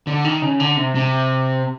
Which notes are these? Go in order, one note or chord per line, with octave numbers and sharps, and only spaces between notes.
D3
D#3
C#3
D3
C3
C3